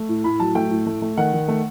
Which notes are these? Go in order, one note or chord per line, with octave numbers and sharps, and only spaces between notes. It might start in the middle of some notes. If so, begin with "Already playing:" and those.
Already playing: A3
A2
A2 B5
F#3 A5
A3 G5
A2
A3
A3
D#3 F#5
D#3
A3